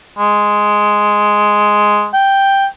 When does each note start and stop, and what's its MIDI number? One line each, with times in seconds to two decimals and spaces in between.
0.19 2.08 56
2.14 2.66 79